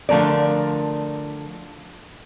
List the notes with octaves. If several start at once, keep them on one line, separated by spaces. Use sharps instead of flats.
D3 F3 A3 A#4 D5